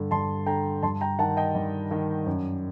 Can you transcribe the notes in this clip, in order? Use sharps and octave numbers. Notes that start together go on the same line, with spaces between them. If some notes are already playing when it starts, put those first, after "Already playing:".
Already playing: G2 D3
G2 A5 C6
D3 G5 A#5
G2 A5 C6
G5 A#5
D#3 F#5 A5
D#5 G5
G2
D#3
F#2